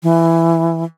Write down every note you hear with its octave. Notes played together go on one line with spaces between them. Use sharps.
E3